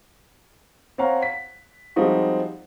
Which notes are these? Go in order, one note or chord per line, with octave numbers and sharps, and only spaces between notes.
C4 C#5 F5 F#5 A#5
B6
F3 G3 G#3 C4 D#4 F#4